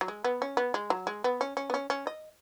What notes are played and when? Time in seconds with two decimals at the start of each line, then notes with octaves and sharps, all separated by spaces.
0.01 F#3
0.08 G#3
0.24 B3
0.42 C#4
0.57 B3
0.74 G#3
0.90 F#3
1.07 G#3
1.24 B3
1.41 C#4
1.57 C#4
1.70 B3
1.74 C#4
1.90 C#4
2.07 D#5